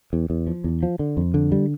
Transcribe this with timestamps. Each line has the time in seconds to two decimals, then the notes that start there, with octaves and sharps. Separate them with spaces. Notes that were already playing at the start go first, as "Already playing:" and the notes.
0.13 E2
0.30 E2
0.47 F3
0.64 E2
0.83 F3
0.99 D3
1.17 F2
1.34 D3
1.52 G3